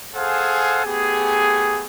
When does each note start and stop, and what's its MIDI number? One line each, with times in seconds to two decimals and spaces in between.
0.15 0.81 68
0.15 0.81 69
0.15 0.81 72
0.15 0.81 77
0.15 0.81 78
0.15 0.81 80
0.85 1.85 57
0.85 1.85 59
0.85 1.85 67
0.85 1.85 68